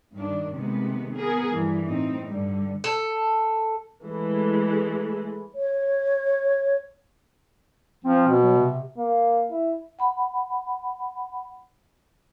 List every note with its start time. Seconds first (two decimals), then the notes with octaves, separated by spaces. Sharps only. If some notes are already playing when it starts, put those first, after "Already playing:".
0.16 G2 D#3 D4
0.54 C3 D#3 G#3 A3 B3
1.15 B3 G#4 A#4
1.51 G2 E3 G3
1.90 A2 C4 D#4
2.28 G2 D3 G3
2.84 A4
4.02 E3 G#3 A3
5.55 C#5
8.04 F3 C4
8.27 B2
8.43 F#3
8.58 C3
8.98 A#3
9.52 E4
9.99 F#5 B5